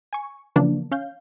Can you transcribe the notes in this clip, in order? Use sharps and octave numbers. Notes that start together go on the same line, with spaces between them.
G#5 C#6
C#3 E3 F3 A#3 B3 D4
C#4 F5 G6